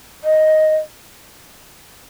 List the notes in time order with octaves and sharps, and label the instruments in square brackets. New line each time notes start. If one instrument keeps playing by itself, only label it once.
[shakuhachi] D#5